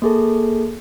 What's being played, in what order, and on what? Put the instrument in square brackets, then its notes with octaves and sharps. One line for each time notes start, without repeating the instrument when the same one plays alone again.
[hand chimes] A#3 G#4 A4